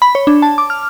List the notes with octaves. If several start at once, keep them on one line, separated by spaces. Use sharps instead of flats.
B5
C#5
D4
A5
D6
F6